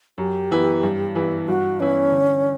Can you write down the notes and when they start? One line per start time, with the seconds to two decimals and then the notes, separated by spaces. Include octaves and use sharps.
0.18 F#2 G4
0.51 E3 B3 E4
0.83 G2
1.15 E3 B3 E4
1.48 G2 F#4
1.80 E3 B3 C#4 E4
2.12 D3